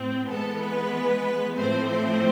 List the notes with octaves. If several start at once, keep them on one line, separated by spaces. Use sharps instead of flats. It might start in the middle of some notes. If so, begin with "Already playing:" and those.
Already playing: A2 C4
E3 G#3 B3 A4
B4
A2 F3 A3 C4 C5
C5